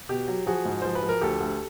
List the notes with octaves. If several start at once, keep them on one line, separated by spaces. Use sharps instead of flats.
B2 G4
F#3
F3 F#4 G#4
G#2
F3 C5
B4
F3
A#4
D2 G4 A4
D2